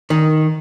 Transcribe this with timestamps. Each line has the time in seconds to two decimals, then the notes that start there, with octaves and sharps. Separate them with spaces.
0.10 D#3